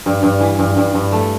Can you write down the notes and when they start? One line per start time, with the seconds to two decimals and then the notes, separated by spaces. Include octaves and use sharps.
0.06 G2
0.23 G2
0.41 E3
0.59 G2
0.77 G2
0.95 G2
1.12 A3